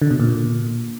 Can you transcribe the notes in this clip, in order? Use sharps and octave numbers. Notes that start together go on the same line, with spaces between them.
D3
B2
A#2